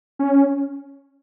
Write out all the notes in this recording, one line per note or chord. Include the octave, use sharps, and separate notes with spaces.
C#4